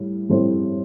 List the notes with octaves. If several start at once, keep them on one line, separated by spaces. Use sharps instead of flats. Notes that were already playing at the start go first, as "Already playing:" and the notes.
Already playing: A2 G3
A2 G3 C4 A4 C5